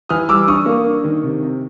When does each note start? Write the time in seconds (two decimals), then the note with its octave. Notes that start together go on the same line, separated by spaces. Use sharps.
0.09 E3 D#6 F6
0.29 G3 D6 E6
0.47 D4 C#6 D#6
0.66 A#3
0.85 D4
1.04 D#3
1.24 C3
1.43 C3